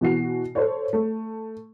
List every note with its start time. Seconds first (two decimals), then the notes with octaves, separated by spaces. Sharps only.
0.01 B2 E3 F#4 C7
0.55 A4 C5 C#5
0.93 A3